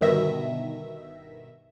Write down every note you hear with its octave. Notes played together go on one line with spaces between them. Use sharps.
G1 B2 D#3 E5 A#6